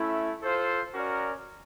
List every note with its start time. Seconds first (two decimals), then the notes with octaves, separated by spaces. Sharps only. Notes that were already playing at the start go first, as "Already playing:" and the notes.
Already playing: A3 C#4 E4
0.42 F4 A4 C5
0.92 C#4 F#4 A#4 D5